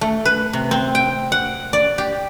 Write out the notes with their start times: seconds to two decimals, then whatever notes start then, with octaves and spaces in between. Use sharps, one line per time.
0.01 A3
0.25 B4
0.53 C3
0.71 C4
0.95 G5
1.32 F#5
1.73 D5
1.98 G4